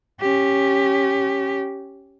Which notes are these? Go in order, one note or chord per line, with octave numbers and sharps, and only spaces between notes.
C#4 G4